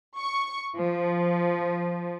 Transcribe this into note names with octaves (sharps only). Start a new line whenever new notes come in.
C#6
F3